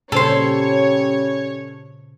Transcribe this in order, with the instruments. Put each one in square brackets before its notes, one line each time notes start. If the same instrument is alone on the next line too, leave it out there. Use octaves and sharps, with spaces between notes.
[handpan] A#2 C#3 C5 [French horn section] G3 C#4 [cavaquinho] A4 C6 [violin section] C#5